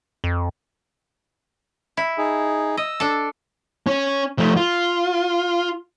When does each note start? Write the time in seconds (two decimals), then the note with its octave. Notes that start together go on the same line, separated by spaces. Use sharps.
0.24 F2
1.97 E4
2.18 D#4 G#4
2.77 D#5 E6
3.00 D4 A4
3.87 C#4
4.38 F3 A3
4.56 F4